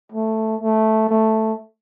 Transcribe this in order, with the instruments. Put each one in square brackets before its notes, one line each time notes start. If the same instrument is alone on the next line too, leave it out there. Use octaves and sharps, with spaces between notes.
[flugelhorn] A3
A3
A3